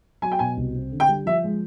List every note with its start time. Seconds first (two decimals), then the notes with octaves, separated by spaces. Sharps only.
0.22 F#3 G#5
0.32 G5
0.39 B2 G#5
0.57 C2
0.75 C4
0.92 D3
1.00 G5
1.08 G3
1.26 F3 E5
1.44 G#3